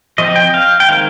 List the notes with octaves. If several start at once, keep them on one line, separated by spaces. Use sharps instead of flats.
F3 C4 D#5
G5
F5
G5
D#3 G#3 C4 F5